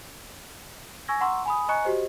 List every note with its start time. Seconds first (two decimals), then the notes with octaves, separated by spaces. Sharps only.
1.08 G#5 C#6 E6 G#6 A#6
1.21 F#5 A#5 C6 C#6 E6
1.45 G#5 B5 D#6
1.69 D#5 G#5 A#5 C#6 F#6 C#7
1.84 F#4 G4 C5 D#5